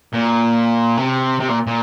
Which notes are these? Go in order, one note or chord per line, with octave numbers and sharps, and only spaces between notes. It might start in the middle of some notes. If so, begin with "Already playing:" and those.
A#2
C3
C3
A#2
A#2